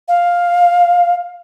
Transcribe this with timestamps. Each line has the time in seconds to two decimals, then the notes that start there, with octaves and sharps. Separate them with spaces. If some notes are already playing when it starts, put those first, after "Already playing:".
0.08 F5